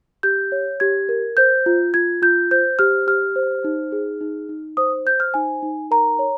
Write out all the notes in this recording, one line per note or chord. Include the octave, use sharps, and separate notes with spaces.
G4 G6
C#5
G4 G#6
A#4
C5 G6
F4
F4 G#6
F4 G6
C5 G6
G4 F6
G4 F6
C5
D#4
G#4
D#4
D#4
C5 D#6
C5 G6
F6
D#4 G#5
D#4
A#4 A#5
C#5